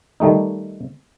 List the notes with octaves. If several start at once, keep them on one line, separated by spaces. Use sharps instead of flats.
D#3 G3 A3 D#4